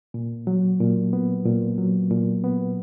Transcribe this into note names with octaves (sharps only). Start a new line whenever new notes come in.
A#2
F#3
A#2
B3
A#2
F#3
A#2
B3